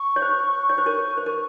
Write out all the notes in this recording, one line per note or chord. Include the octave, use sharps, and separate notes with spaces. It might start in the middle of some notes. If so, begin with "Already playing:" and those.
Already playing: C#6
C#5
C5
C#5
C5
A#4 C#5
C5
A#4